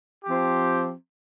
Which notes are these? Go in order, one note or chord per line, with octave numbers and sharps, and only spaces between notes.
F3 C4 G4